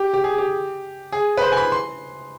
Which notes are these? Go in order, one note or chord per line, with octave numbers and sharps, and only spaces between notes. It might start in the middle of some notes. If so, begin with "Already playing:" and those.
Already playing: G4
G4
G#4
G4
G#4
B4
C5
G#5
B5
C6